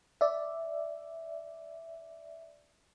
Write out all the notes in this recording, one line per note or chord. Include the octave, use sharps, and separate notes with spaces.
D5 E5